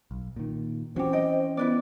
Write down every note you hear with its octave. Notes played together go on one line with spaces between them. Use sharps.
B1
A#2 D#3
E3 C4 C#4 F#4 G4 C5
D#5 G5
B3 E4 B4 D5